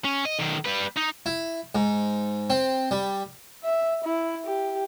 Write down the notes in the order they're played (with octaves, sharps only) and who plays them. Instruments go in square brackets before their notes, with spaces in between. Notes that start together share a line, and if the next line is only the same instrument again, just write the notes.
[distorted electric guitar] C#4
D#5
B1 D#3
G3 B4
D#4
[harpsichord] E4
G#2
C4
G3
[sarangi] E5
E4
G4